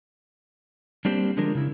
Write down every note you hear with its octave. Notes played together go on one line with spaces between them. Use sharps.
G3 A#3 C4 D4 G4 C5
D3 F3 G#3 D4 A#4
C#3 E4